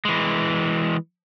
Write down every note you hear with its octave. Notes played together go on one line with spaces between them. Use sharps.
E3 G#3